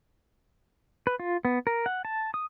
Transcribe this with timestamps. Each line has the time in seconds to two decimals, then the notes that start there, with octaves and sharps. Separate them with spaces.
1.07 B4
1.20 F4
1.45 B3
1.67 A#4
1.86 F#5
2.05 A5
2.34 D#6